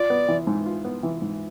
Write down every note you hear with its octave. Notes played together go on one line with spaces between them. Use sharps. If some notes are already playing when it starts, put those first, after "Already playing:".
Already playing: F4 D5
B3
E3
G#2
F4
B3
E3
G#2